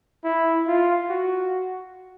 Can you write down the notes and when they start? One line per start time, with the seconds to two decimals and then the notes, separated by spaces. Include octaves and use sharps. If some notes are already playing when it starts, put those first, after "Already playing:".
0.24 E4
0.67 F4
1.10 F#4